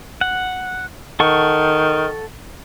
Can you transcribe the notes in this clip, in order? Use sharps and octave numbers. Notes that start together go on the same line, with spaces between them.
F#5
D#3 A4 F#5 C#6